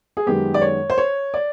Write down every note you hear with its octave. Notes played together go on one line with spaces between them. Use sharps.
G#4
F#2 D#3 G#3 B3 G4
D5
C#5
C5
C#5
D5